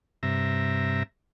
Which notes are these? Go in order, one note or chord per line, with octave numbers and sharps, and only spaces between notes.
G2 C3 E5 A#5